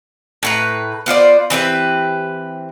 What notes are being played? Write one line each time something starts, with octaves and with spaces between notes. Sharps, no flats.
A2 B4 A#5
B3 F4 C5 D5
E3 C4 G4 B4